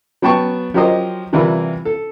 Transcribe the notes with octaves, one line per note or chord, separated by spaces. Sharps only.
F#3 B3 G5 A5 C#6
F3 F#3 G4 A#4 C5 D#5
C3 E3 G3 E4 F4 A#4
A4